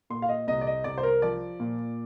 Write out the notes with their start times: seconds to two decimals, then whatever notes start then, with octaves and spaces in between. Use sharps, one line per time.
0.10 A#2 C6
0.22 F5
0.29 D#5
0.47 C2 D#5
0.61 D5
0.67 D#5
0.84 C2 D5
0.98 C5
1.03 A#4
1.22 F3 D5
1.60 A#2